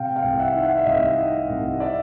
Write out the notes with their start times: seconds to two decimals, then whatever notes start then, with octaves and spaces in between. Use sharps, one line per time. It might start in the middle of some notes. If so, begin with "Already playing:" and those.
Already playing: C3 F5 G5
0.16 F5 G5
0.23 C2
0.39 E5 F#5
0.55 D#3
0.63 E5 F#5
0.77 E5
0.86 C2 D#5 F5
1.18 D#3
1.50 C2
1.80 D5 E5